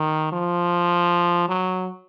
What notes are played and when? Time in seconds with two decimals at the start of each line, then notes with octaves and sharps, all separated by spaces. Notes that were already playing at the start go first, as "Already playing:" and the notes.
Already playing: D#3
0.32 F3
1.48 F#3